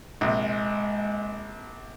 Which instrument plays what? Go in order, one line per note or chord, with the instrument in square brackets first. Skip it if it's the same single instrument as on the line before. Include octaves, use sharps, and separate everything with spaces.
[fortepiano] A#1 C3 [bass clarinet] G#3